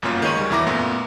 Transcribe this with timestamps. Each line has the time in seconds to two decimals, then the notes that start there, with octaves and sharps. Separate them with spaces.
0.02 G1 F#2 B2 A#3 C#4 F4
0.22 D#3 G#3 C#5 D#7
0.37 D2 G3
0.50 E2 B2 E4 A#5 D6 A#6
0.67 F#2 A#2 A3 B3